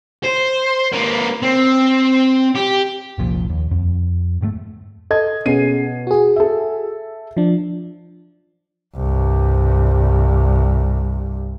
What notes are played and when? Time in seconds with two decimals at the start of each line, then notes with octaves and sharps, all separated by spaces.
0.24 C5
0.92 A#3 B4
1.42 C4
2.55 G4
3.18 F#1 C2 A#2 F3
3.49 D#2
3.71 F2
4.41 D1 G#2 F#3 A3
5.11 A4 D#5 G#6
5.46 B2 C#4 G#4 C7 D#7
6.07 F#4 G#4
6.36 A4 E5
7.37 F3 D4
8.96 C2 G2